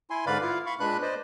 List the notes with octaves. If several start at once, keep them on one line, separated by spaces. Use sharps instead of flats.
E4 G#5 C6
G#2 D3 B4 D5 F5 B5
E4 F4 F5
F5 B5 C#6
A#2 G#3 D4 B4 B5 F#6
B4 C5 D5 D#5